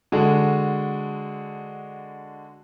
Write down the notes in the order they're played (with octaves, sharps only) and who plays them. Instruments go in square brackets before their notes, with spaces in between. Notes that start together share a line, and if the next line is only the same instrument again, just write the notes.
[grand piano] D3 G#3 F#4